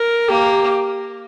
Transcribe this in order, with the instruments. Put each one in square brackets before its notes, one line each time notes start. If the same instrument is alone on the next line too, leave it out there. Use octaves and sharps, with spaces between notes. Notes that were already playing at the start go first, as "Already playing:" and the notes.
Already playing: [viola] A#4
[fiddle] A#3 [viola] G4